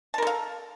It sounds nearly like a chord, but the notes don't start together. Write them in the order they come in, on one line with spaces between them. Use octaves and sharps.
A5 A#4 A4 F5